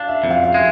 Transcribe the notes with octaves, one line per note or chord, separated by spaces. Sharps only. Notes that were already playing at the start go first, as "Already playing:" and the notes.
Already playing: D4 F5
E5
F2
F5
F5
G#3 E5